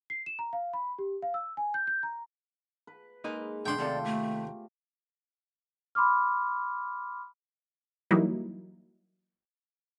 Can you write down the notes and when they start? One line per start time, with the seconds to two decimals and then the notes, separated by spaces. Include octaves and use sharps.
0.10 C7
0.26 E7
0.39 A#5
0.53 F5
0.73 B5
0.98 G4
1.22 F5
1.34 E6
1.57 G#5
1.74 G6
1.87 G6
2.03 A#5
2.87 B4
3.24 G#3 A#3 D#4 B4
3.66 G#2 D3 A3 B3 D4 G5 C6
3.78 D#2 C3 C4 F4 G4 A4 D5
4.05 A3
5.95 B5 C6 D6 F6
8.11 E3 F#3 G3 A#3 D#4 E4